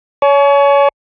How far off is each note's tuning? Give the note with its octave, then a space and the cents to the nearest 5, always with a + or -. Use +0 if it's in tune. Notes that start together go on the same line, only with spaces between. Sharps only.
C#5 +25 G#5 +45